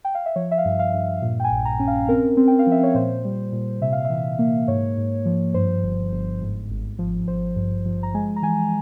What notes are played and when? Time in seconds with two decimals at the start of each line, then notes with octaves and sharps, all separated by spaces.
0.05 G5
0.15 F5
0.26 E5
0.36 F3 C#5
0.51 E5
0.58 F5
0.65 G2
0.79 F5
0.93 G2
1.22 A#2
1.40 G5
1.44 G#5
1.51 A#1
1.65 A#5
1.79 C#4
1.88 F5
2.09 C4 A#4
2.37 C4
2.48 G5
2.59 F5
2.67 F3 E5
2.83 C#5
2.94 A#2 C5
3.25 G3
3.52 A#2
3.81 C3 E5
3.93 F5
4.05 E5
4.10 E3
4.39 A#3
4.68 G#2 C#5
4.97 G#2
5.26 F3
5.54 G2 C5
5.83 G1
6.12 G1
6.41 G#2
6.70 G#1
6.99 F3
7.28 G#1 C5
7.56 G2
7.86 F3
8.03 A#5
8.14 G#3 G#5
8.36 A#5
8.42 E3 G#5